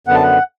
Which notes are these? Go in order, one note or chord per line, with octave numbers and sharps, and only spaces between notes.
F#2 D3 B3 F#5
A5
F#5